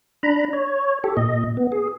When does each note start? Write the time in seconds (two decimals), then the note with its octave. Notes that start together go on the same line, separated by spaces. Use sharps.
0.23 D4 A#5 B5
0.53 C#5
1.04 G4 A4
1.17 A#2 D#5
1.57 B3
1.72 G#4